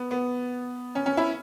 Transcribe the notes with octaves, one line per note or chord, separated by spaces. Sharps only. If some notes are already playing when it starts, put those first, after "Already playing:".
Already playing: B3
B3
C#4
C#4
E4